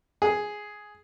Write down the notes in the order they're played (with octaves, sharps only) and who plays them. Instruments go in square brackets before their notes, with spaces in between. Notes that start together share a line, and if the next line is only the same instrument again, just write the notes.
[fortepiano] G#4